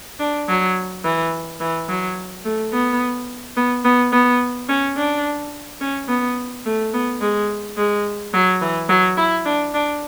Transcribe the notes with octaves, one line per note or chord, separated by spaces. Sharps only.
D4
F#3
E3
E3
F#3
A3
B3
B3
B3
B3
C#4
D4
C#4
B3
A3
B3
G#3
G#3
F#3
E3
F#3
E4
D4
D4